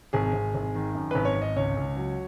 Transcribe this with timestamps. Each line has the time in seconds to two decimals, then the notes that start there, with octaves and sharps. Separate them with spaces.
0.13 G#1 G#4
0.33 G#1
0.55 G#1
0.75 D#3
0.95 F#2
1.11 G#1 B4
1.25 C#5
1.36 G#1
1.42 D#5
1.56 C#2 C#5
1.77 C#2
1.97 F#3